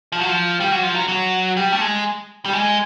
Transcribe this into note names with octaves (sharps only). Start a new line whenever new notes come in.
F3
F#3
F3
G3
F#3
F3
F#3
F#3
G3
A3
G#3
G3
G#3